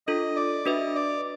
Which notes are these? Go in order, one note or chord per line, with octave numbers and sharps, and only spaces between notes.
D4 F4 A4 D#5
D5
D4 F#4 B4 D#5 E5
D5